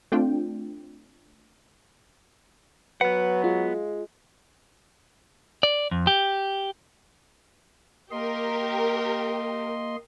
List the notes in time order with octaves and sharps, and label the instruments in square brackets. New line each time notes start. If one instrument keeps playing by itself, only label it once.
[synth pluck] A3 C4 D4 F4 G5
[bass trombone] F#3 [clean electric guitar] B3 F#5 [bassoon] B4
[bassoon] G#3 [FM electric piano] F4
[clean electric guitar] D5
F2
G4
[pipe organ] A#3 D#5 C6 [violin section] G4 A#4